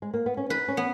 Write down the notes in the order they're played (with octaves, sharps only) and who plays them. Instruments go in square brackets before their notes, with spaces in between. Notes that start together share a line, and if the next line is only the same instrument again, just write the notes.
[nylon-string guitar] G#3
A#3
B3
C#4
[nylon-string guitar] D#4 [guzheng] B4
[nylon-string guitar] C#4
[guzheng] B3